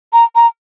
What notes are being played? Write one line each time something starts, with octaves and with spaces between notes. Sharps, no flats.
A#5
A#5